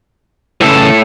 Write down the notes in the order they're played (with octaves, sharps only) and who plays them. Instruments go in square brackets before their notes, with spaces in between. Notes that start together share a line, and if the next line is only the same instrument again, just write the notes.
[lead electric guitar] A2 A4 [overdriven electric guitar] C#3 E3